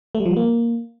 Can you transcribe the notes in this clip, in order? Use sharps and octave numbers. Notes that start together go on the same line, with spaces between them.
A3
G3
F3
G3
A#3